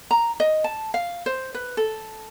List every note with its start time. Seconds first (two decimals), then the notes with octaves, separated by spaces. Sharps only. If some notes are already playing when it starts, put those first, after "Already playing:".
0.11 A#5
0.40 D#5
0.64 A5
0.94 F5
1.26 C5
1.54 B4
1.77 A4